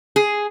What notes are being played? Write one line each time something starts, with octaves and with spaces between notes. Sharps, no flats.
G#4